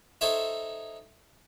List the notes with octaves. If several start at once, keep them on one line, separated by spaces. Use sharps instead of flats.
D#4 A4 C5 C#5 E5